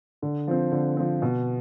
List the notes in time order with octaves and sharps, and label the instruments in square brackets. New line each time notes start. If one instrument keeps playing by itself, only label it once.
[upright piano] D3
F3 C4
D3
F3 C4
B2